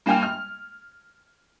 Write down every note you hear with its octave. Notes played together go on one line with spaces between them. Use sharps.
G2 A#3 D4 G5 G#5 F6
F6